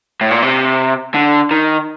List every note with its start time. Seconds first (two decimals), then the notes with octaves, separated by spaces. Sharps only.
0.21 A2
0.31 A#2
0.42 C3
1.14 D3
1.51 D#3